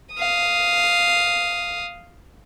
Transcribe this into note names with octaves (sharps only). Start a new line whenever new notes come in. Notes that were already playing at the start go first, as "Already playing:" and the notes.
F5 D#6